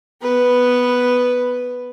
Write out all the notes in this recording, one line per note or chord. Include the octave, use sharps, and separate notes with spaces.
B3 B4